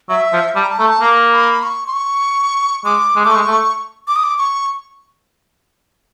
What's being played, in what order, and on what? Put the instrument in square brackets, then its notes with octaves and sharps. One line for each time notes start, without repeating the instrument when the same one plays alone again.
[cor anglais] F#3 [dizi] E5
[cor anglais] F3
[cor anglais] G3 [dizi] A5
[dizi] A#5
A5
[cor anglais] A3 [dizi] A#5
[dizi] A5
[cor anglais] A#3 [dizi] A#5
[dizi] B5
C#6
C6
C#6
[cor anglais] G#3 [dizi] D6
[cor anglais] G#3
[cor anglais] A3 [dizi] D6
[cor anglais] G#3 [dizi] C#6
[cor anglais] A3
[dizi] D6
D#6
D6
C#6